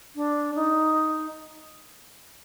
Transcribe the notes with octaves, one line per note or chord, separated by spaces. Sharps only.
D4
D#4